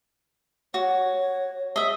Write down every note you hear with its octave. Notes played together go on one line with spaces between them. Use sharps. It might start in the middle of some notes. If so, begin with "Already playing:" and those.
F#4 C#5
D#5 E5